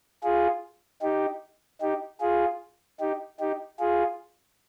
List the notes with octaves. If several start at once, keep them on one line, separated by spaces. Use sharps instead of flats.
F4 G#4
D#4 G4
D#4 G4
F4 G#4
D#4 G4
D#4 G4
F4 G#4